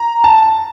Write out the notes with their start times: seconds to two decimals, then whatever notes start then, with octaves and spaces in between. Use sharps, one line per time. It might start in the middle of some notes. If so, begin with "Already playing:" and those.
Already playing: A#5
0.24 A5